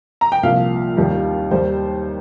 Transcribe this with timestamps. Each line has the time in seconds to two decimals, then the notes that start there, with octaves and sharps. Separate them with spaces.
0.21 A#5
0.32 G5
0.43 C2 A#2 F3 F5
0.97 D#2 D#3 G3
1.51 D#2 D#3 G3 C5